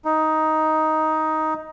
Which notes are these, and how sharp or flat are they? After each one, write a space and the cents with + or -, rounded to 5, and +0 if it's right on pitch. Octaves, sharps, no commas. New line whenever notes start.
D#4 +10